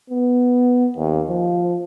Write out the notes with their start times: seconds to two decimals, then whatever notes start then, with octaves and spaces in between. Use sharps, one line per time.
0.10 B3
0.97 D#2
1.29 F3